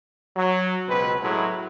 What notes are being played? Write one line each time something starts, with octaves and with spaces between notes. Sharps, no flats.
F#3
C#2 B2 C4 B4
A2 F#3 G#3 E4